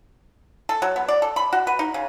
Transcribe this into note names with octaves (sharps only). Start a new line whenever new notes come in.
A4
F#3
B3
D5
A4
B5
F#4
B4
D#4
C#3